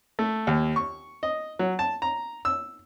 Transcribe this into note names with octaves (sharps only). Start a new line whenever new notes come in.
A3
D#2
C#6
D#5
F#3
A5
A#5
E6